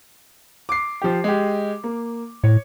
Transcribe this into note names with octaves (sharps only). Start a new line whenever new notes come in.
D6 C7
F3 G4
G#3 G4
A#3
A2 C#5